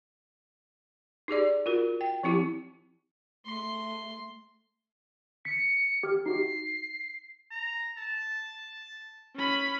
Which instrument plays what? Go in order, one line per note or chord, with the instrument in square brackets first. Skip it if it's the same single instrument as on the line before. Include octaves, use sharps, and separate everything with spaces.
[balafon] D#4 G4 G#4 D5
F4 F#4 A#4
G5
F3 C4 E4 G4
[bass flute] A3 [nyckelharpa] C6
[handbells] B6 [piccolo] C#7
[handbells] G4 F6
[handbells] D#4 F#4 G4 [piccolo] C7
[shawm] A#5
A5
[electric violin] C#4 B5